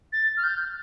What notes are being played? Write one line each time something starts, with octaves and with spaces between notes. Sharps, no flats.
A6
F6
G6